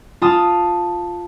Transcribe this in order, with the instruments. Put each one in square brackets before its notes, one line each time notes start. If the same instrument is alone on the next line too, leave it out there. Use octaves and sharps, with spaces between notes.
[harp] F4 A5 D#6